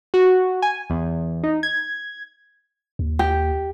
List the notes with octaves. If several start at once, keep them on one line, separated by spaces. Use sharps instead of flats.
F#4
G#5
E2
D#4
G#6
D#2
G4